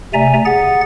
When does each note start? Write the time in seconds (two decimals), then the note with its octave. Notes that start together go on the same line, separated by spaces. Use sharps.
0.14 C3 A3 D5 E5 G#5 A#5
0.45 G#4 F#5 A6